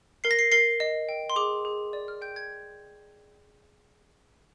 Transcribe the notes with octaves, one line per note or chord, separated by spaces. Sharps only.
A#4 C7
A#6
C7
A#4 C7
D#5
G5
C6
G#4 D6
G#4
D5
F6
G5 G6
G#6